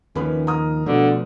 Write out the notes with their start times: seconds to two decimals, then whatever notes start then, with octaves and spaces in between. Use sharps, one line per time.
0.15 D#2 D#3 F3 C#4 B4 B5
0.47 A#5 D#6 F6
0.86 B2 D3 F3 A3